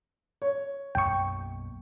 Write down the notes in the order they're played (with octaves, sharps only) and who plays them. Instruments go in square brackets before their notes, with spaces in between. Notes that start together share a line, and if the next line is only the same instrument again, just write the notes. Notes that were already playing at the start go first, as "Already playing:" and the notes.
[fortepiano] C#5
[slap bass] B1 F#2 A#3 [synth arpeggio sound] G5 C#6